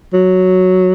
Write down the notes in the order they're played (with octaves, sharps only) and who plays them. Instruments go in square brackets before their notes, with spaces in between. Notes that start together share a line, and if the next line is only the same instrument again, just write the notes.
[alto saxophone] F#3